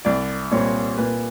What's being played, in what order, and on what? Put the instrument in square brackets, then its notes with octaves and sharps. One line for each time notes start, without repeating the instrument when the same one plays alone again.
[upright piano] C2 [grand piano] D5
[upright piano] A#2 G3 C4 [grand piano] C#5
[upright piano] A#2 [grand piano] B4